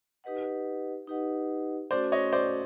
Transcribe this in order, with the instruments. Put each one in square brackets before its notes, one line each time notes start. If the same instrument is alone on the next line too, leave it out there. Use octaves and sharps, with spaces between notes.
[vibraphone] D#4 G4 B4 D#5 F#5
D#4 G4 B4 D#5 F#5
[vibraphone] A3 C#4 F#4 A4 [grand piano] C5 D5
[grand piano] C#5 D#5
C5 D5